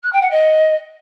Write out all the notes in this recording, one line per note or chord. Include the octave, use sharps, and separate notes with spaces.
F#6
G5
F#5
D#5